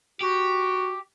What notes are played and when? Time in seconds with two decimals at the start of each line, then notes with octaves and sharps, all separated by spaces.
0.21 F#4 G4